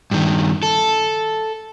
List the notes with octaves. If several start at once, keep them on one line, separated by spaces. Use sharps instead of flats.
G2 D#3
A4